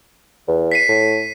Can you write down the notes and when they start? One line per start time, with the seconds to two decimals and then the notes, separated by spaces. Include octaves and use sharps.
0.48 E2
0.72 B6 C7 D#7
0.89 A2